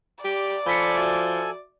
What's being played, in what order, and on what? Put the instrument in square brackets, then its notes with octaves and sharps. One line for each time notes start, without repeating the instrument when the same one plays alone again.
[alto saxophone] G4 [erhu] D5
[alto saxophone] F3 [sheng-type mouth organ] A4 G#5 [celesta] B5 B6 C#7
[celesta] F#4 E5